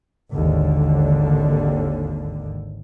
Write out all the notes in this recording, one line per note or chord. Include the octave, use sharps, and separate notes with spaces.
G#1 D#2 D3